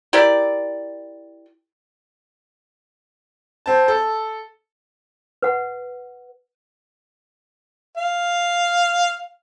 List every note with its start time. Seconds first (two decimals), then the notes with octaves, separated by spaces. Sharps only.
0.13 E4 G4 A#4 D5
3.66 C4 A5
3.88 A4
5.42 B4 F#5
7.97 F5